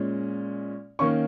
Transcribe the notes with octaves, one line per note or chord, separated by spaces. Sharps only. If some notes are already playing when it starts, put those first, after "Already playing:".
Already playing: A#2 G#3 C#4
D#3 A#3 C#4 C#6